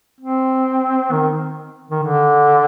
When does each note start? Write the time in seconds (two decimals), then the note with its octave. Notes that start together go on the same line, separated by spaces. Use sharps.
0.21 C4
1.11 D#3
1.91 D#3
2.03 D3